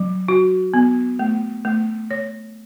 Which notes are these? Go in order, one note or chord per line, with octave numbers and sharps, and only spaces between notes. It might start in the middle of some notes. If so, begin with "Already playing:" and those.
Already playing: F#3
F#4
B3
A3
A3
C#5